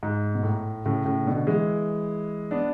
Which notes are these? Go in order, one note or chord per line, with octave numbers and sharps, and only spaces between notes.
G#2
B2
A2
A2 C#3
A2 C#3
B2 D3
E3 G#3
B3 D4